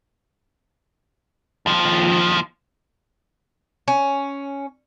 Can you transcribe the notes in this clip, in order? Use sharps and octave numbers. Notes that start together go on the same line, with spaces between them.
D#2 F3
C#4